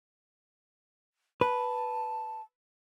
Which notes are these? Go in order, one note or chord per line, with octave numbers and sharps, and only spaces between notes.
B4 A5